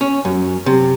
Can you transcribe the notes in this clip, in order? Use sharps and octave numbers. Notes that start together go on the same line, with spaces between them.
C#4
F#2
C3